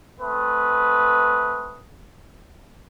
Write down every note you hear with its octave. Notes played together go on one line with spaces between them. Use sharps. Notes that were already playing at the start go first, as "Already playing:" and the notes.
A3 C4 B4 D#6